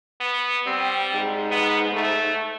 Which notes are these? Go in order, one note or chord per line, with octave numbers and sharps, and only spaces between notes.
B3
G3 C4
G#2
B3
A3